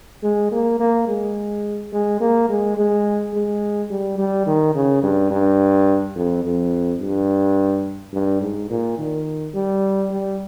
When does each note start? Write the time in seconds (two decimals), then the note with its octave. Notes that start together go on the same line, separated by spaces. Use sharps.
0.23 G#3
0.52 A#3
0.80 A#3
1.08 G#3
1.92 G#3
2.20 A#3
2.49 G#3
2.77 G#3
3.34 G#3
3.90 G3
4.18 G3
4.47 D#3
4.74 C#3
5.03 G2
5.31 G2
6.16 F2
6.44 F2
7.01 G2
8.13 G2
8.42 G#2
8.70 A#2
8.98 D#3
9.54 G3
10.11 G3